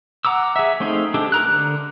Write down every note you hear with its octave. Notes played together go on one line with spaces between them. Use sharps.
F#5 A#5 D6 E6
G#4 E5
A3 C4 D#4 G#4 F5
G#3 D4 G4 A4
A#4 A#5 F#6
D3